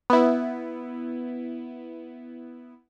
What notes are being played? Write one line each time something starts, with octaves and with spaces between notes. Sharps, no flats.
B3 E4